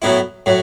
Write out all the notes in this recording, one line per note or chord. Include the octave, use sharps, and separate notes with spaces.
A2 F#3 B3 E4
A2 F#3